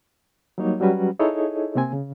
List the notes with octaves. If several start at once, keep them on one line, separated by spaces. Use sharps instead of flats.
F#3 G3 A#3 D#4 C#5
F#3 G3 C#4 F#4 B4
D#4 E4 G#4 A4 C#5 D#5
C3 A#3 C4 G#5
C#3